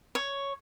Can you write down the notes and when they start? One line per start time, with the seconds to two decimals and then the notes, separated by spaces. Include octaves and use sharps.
0.15 C#5